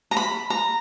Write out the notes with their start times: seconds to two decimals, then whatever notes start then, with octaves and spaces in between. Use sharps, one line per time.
0.11 A#5
0.17 B5
0.50 A#5